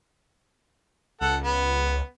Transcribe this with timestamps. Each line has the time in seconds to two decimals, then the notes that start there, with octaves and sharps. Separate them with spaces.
1.21 C#2 A4 F#5
1.44 B3